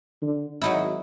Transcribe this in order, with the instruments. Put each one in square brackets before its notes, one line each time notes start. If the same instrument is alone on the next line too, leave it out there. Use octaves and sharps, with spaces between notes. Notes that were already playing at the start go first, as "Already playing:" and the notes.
[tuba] D3
[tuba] G#1 [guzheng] F#3 D#4 E4